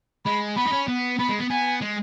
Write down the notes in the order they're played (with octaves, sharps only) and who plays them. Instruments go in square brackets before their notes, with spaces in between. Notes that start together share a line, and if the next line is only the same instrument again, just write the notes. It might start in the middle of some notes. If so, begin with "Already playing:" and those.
[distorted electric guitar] G#3 [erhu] B5
[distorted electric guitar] B3 [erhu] B5
[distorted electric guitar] D#4
C#4
B3
[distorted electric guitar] B3 [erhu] B5
[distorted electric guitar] G#3
B3
[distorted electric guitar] B3 [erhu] G#5
[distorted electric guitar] G#3